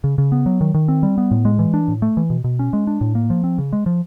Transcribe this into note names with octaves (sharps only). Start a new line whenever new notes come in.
C#3
C#3
B3
F#3
D#3
D#3
C4
G3
B3
A2
G#3
E3
D4
A2
A3
E3
B2
B2
C#4
G#3
D4
A2
A#3
F3
C4
C#3
G#3
F3